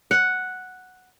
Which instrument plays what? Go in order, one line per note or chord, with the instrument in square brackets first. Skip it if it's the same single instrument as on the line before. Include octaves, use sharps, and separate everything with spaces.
[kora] F#5